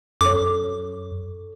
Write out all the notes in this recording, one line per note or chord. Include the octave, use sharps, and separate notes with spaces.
F#2 A4 C#5 D6